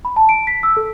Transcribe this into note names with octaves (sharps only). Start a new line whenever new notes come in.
B5
A5
D7
B6
E6
A4